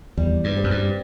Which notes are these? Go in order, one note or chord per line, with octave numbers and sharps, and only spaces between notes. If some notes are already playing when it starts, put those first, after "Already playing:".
E2 G3
G2
C4
F#2
G2